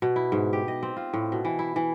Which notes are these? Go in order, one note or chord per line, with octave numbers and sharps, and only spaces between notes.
B2
E4
G#2
G4
D#5
C4
F4
A2
B2
E3
E4
E3